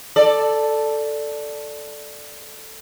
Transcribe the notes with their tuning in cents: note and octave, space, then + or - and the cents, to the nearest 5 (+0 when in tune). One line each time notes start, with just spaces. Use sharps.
A4 +0 D5 +5